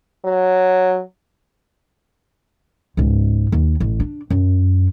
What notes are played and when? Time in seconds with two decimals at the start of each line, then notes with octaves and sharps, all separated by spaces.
0.25 F#3
2.97 C#2 G#2
3.52 D#2
3.80 A1
4.00 D4
4.30 F#2